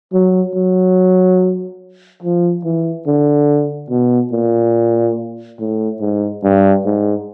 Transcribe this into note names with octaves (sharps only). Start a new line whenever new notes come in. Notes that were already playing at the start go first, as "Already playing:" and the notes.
F#3
F#3
F3
E3
D3
B2
A#2
A2
G#2
G2
G#2